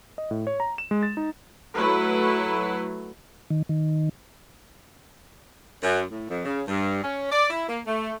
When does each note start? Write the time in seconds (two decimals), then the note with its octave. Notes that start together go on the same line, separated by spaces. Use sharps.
0.18 D#5
0.31 A2
0.47 C#5
0.60 A#5
0.78 E7
0.91 G#3
1.03 A6
1.17 D#4
1.75 F#3 A3 E4 B4
3.50 D#3
3.69 D#3
5.83 F#2
6.11 A2
6.29 F2
6.45 C#3
6.67 G2
7.03 C#4
7.32 D5
7.50 E4
7.68 A#3
7.86 A3